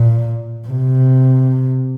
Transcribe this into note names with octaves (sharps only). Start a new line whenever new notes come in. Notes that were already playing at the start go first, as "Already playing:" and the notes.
Already playing: A#2
C3